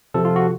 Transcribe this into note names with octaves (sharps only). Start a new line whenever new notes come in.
C3 F3 A4
F4
F#4